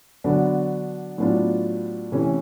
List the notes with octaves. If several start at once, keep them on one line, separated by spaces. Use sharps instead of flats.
D3 F#3 B3 D4 F#4
A2 F#3 B3 D4 F4
C3 E3 A3 C#4